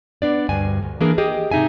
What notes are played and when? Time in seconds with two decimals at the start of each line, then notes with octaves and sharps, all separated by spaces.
0.22 B3 D4 D5
0.49 D2 G2 G#5
0.83 D2
1.01 E3 A#3 D4 G#4 A#4
1.18 G4 G#4 D#5
1.51 G#2 C3 D#4 E5 G#5